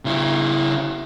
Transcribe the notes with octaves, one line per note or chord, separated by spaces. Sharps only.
C#3 E4